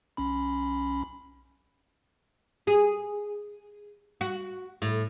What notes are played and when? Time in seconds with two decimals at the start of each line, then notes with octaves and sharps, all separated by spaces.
0.17 B1 C#4 B5
2.67 G#4
4.21 F#4
4.82 A2